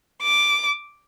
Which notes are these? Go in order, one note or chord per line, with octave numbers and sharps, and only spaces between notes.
D6